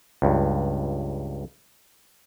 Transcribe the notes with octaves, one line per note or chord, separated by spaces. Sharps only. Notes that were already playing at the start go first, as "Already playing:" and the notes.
C#2 G2